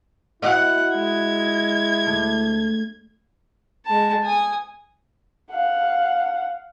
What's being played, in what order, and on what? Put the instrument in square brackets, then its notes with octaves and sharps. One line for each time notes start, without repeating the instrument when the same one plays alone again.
[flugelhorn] E4 [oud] F#4 D#5 [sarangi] F#5
[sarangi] G#3 [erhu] G#6
[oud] D2
[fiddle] G#3 A5
G#5 D#6
[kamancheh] F5 F#5